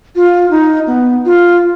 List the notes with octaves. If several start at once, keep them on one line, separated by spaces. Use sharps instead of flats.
F4
D#4
B3
F4